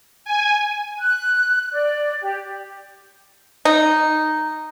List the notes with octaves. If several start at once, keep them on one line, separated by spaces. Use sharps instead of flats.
G#5
F#6
D5
G4
D#4